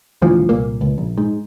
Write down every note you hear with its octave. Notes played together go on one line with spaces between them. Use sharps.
D#1 D2 E3 F3
C2 A#2 A#3
C#2
A#1
G#2